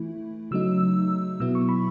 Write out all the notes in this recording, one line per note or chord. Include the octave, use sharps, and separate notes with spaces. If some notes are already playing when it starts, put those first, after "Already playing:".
Already playing: E3 A3 E4
C#3 F#3 A3 D#4 E6
B2 F#3 B3 E4 E6
C#6
B5